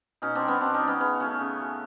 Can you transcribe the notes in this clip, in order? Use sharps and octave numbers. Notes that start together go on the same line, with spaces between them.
B2 C#4 D#4
C4 D4
G3
B3 C#4
B2 C4 D4
C#4 D#4
G3
B3 C#4
C#3 B3 C#4
F#3 A3 B3 C#4
C#3
F#3 A3